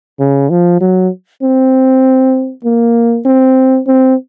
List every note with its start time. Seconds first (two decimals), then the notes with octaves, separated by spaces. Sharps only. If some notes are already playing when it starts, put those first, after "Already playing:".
0.20 C#3
0.50 F3
0.81 F#3
1.43 C4
2.65 A#3
3.25 C4
3.87 C4